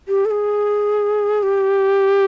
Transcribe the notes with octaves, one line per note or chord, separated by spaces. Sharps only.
G4
A4
G#4
G4